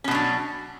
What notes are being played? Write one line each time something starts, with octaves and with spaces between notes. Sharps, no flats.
B2 F#3 C#4 D4